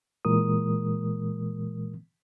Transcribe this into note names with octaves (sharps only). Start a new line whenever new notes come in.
A#2 E3 G#3 A#4 D#6